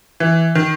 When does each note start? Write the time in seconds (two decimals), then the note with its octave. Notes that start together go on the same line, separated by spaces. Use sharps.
0.20 E3
0.55 D#3